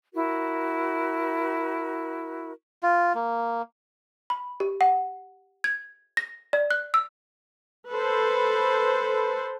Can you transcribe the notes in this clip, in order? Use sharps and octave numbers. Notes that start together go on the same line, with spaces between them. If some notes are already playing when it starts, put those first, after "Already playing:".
E4 F#4 A#4
F4
A#3
B5
G4
F#5
G#6
A#6
D5
F#6
E6
A4 B4 C5